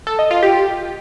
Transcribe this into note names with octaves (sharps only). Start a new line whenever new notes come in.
A4
D#5
F4
G4